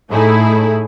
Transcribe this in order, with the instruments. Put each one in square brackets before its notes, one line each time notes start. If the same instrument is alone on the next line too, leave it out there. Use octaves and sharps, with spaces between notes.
[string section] A2 A3 D#4 E4 G#4